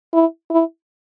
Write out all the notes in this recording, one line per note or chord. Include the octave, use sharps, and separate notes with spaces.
E4
E4